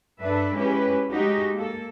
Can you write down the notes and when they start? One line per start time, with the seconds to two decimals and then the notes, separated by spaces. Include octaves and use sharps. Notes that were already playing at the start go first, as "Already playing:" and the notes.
0.21 G2 D4 A4 B4 E5
0.53 G#3 C#4 E4 G4 B4
1.10 G#3 D#4 F#4 G4
1.54 A#3 A4